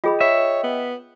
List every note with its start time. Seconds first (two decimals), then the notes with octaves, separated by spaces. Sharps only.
0.04 F4 G#4 D#5 G5 B5
0.21 C#5 E5
0.64 B3